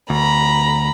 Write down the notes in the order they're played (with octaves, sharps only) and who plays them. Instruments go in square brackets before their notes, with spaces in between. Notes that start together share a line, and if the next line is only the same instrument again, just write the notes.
[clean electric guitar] D2 [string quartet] A#5 B5